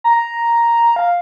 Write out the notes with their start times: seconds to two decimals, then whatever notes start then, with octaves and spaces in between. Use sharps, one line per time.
0.04 A#5
0.96 F5